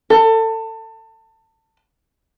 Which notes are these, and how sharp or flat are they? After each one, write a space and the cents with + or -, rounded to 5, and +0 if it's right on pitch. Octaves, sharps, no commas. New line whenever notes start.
A4 +25